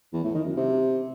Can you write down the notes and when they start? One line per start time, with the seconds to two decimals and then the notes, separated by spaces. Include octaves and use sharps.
0.13 E2
0.24 A2
0.35 D#3
0.46 F#2
0.57 C3